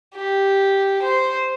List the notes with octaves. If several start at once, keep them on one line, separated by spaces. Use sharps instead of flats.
G4
C5